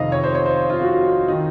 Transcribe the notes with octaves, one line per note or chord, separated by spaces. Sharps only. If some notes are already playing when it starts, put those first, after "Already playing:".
Already playing: F2 C3 D#3 D#5 F5
C#5
C5
C#5
C5
F4
F#4
D#3 D#4